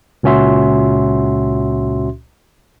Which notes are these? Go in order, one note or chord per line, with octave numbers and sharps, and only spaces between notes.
C#2 A#2 C#4 F#4 E5 C6